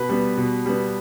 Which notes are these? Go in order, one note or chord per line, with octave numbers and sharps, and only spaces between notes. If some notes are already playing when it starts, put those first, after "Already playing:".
Already playing: B2 B4
G3 B3
B2
G3 B3